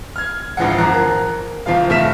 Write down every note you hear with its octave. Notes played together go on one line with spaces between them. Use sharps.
F6 G#6
A1 D2 F3 G#3 F#5
G1 F3 A#5 F#6
A#4
F#1 F3 F4 F5
F1 A3 F6 B6 E7